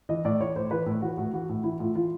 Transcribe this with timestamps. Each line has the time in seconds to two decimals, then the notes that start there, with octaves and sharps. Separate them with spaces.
0.09 E3 D#5
0.25 A2 D5
0.40 E3 C#5
0.56 A2 C5
0.71 E3 B4
0.86 A2
1.02 E3 F#4
1.17 A2 F#4
1.33 E3 F#4
1.49 A2
1.64 E3 E4
1.79 A2 F4
1.95 E3 F4